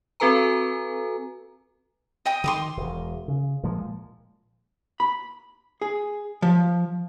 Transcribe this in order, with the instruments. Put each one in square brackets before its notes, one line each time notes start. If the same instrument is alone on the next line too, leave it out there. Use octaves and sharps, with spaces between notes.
[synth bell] C4 F#4 A4 B4 G#5 A#5
[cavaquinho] D#5 G5 D#6
[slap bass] D#3 [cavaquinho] C6 D6 D#6
[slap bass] E1
C#3
A#2 F3 G#3
[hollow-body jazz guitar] B5
G#4
F3